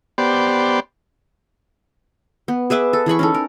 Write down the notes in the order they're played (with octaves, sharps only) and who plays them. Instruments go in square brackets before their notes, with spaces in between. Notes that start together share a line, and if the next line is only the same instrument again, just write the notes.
[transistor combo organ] B3 G4 C5 D5
[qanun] B3
G#4 B4 E5 D6
A4
E3 G#4 B5 C#6
C#4 D#4 A4
A#4